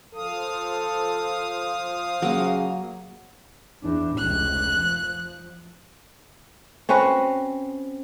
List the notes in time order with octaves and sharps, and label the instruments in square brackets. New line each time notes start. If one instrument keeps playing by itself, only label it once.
[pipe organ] F3 F5 D#6 [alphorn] A4
[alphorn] C#3 [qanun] F#3 A#3
[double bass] E2 D4
[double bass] F1 C#2 [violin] F#6
[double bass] F3
[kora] C4 C#4 F#4 B4